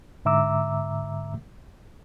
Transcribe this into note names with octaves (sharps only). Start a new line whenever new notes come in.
G#2 D3 E5 A#5 D6 E6